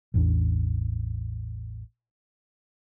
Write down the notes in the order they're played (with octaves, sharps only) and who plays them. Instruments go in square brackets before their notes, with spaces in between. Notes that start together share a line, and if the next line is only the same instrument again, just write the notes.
[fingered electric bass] A1 E2 D4